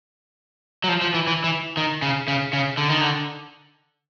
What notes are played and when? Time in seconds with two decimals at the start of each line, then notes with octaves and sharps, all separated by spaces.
0.84 F#3
0.89 F3
1.01 F3
1.14 E3
1.27 E3
1.44 E3
1.77 D#3
2.02 C#3
2.28 C#3
2.53 C#3
2.78 D3
2.90 D#3
3.01 D3